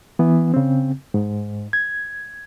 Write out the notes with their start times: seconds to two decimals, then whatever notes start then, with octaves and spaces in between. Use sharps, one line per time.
0.19 E3 B3
0.54 C#3 C4
1.14 G#2
1.73 G#6